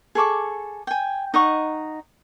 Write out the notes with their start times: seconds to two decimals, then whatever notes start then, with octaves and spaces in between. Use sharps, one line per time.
0.15 G#4 A4 C#6 D6
0.87 G5 G#5
1.34 D#4 D#5 F#5 C#6